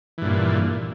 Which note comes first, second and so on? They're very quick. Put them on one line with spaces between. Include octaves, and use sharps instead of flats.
E3 G2 A#2